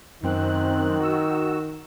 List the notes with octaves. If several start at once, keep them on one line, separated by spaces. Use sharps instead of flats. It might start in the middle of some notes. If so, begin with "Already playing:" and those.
F#2 D#3 C4 F#6
F#4 E6